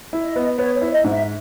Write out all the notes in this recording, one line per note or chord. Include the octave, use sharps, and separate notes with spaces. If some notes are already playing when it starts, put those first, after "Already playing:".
E4
D#5
B3
B3 C#5
C#5
E4
C#5
D#5
G#2
E5